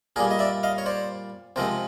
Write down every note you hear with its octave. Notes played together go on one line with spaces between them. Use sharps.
A#2 G3 A#3 G#4 A#4
D#5
D5 E5
D#5 F5
C#5
C5 D5
C3 F3 G#3 C4 A#4 C5